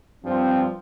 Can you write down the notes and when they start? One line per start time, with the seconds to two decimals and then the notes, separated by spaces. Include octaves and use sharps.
0.24 G2 F3 C4